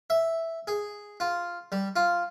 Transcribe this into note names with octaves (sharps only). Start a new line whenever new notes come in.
E5
G#4
F4
G3
F4